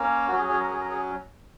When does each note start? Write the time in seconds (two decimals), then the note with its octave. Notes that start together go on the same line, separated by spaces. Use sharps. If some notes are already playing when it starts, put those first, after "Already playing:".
Already playing: A#3 C#4
0.28 F#3 C#4 F#4
0.38 G#4
0.49 G#4
0.59 A#4
0.69 G#4
0.80 A#4
0.90 G#4